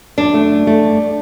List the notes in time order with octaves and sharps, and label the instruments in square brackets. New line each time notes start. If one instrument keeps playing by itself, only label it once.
[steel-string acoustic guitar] F#2 [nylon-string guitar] D4
[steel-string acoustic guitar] A3
F#2
A3
G2